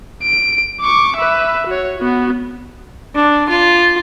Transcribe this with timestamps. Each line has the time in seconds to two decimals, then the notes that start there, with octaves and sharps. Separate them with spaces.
0.23 D7
0.81 C#6 D6
1.16 B4 E5
1.67 F#4 C#5
1.98 B3 F#4
3.15 D4
3.49 F4